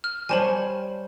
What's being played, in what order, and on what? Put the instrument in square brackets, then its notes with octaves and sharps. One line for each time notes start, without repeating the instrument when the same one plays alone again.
[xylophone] F6
[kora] G3 C5 C#5 [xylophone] G#5 A5 F#7